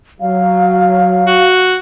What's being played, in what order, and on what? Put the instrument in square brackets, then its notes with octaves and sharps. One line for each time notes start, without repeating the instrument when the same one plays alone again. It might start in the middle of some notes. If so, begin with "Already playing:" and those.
[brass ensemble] F#3 [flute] F5
[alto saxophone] F#4